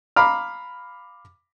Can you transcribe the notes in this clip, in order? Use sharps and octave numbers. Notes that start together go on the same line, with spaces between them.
F5 A#5 B5 D6 F6